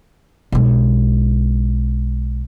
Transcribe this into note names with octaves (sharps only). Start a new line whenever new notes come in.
B1 G#3